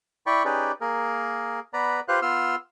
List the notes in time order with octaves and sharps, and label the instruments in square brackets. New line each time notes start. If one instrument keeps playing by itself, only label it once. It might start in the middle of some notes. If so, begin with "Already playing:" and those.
[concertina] E4 D5 G5 B5 C#6
C#4 D#4 G4 G#4 B4 D5
A#3 G#4 A#4
B3 B4 D5 A#5 B5
F4 G4 B4 C5 F5 F#6
B3 F4 C6 E6 F6